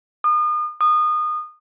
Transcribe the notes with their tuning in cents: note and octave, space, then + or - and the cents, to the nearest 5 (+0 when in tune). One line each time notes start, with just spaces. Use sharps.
D#6 -40
D#6 -25